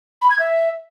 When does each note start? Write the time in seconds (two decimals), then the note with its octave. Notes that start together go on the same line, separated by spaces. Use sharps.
0.22 B5
0.31 G#6
0.39 E5